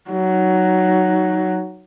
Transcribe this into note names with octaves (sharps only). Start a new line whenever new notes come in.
F#3 D#4